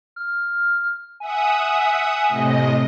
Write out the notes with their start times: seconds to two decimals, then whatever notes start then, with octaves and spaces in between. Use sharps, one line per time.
0.16 F6
1.20 E5 F#5 G#5 D#6
2.28 A2 C3 D#5